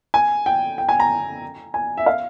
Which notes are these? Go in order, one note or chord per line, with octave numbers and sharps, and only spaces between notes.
G#5
G5
G5
G#5
A#5
G#5
E5
F5